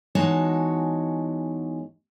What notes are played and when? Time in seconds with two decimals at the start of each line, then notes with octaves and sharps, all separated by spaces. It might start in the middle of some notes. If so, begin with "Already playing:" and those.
0.15 E2 G#3 D#4 F#4 C#5 A5